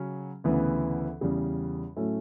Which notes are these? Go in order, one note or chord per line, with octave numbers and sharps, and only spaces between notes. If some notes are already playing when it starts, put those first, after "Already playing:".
Already playing: C#3 F#3 C#4
D2 C#3 E3 B3
E2 C#3 G3
A2 F#3 A3 C#4